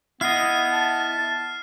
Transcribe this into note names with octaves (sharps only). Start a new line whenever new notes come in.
B3 E4 D#5 F6 C7
A5